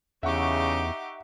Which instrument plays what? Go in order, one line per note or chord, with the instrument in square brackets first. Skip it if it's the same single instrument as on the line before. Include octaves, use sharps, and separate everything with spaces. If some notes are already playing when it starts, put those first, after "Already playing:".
[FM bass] E2 [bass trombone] C#3 [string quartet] D#4 G4 D6 [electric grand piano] E5 F#5 C#6